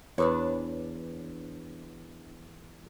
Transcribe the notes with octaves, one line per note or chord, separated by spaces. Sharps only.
E2 D4 B4 C#5